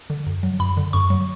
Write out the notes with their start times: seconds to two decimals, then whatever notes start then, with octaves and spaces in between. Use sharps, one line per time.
0.10 D3
0.27 F#2
0.43 F#3
0.60 F#2 B5
0.77 D3
0.93 F#2 C#6
1.10 F#3